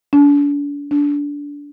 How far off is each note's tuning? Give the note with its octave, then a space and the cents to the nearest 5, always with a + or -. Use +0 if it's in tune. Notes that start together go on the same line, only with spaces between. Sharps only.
D4 -40
D4 -25